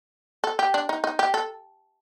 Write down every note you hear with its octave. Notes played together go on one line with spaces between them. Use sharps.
A4
G4
D4
D#4
D#4
G4
A4